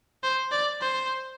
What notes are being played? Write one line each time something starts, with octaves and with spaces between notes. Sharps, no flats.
C5
D5
C5